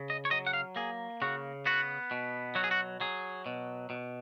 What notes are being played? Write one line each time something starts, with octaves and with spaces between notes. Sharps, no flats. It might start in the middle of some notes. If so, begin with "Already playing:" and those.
Already playing: C#3
D#5
C#5
F#3 D#5
F#5
F5
A#3 G#4
C#3 F#4
B3 F#4
B2
F#3 F#4
G#4
F#4
F#3 G#4
B2
B2